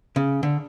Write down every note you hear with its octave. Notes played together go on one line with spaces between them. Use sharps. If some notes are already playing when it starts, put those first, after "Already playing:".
C#3
D3